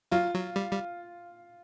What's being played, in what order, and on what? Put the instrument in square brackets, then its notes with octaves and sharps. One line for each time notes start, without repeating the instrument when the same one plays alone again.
[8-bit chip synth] F#3 [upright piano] F4
[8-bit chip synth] F#3
G3
G3